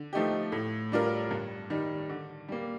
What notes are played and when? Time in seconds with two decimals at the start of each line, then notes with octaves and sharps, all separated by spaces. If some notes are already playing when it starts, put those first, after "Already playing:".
Already playing: D3
0.13 F3 A3 D#4 G4
0.52 A2
0.92 G3 D4 F4 A#4
1.31 G2
1.70 D#3 G3
2.09 D3
2.48 G3 A#3